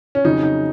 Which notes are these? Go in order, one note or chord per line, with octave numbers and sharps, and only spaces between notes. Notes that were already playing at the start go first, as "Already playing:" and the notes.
C#4
F2 C#3 F#3 D#4
D#4